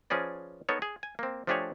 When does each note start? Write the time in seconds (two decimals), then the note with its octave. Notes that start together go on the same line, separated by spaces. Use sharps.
0.10 F3 C#4 G#4 B4 D5
0.69 B3 D#4 A4 A#4 C#5
0.82 G#4
1.03 G#5
1.19 A#3 C4
1.47 F3 A3 D4 G4 G#4 C#5